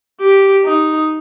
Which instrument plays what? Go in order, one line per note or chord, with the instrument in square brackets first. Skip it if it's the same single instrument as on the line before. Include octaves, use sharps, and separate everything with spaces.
[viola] G4
D#4